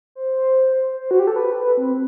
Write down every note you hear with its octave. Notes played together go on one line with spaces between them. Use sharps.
C5
C5
F#4
G4
A4
B4
B4
C4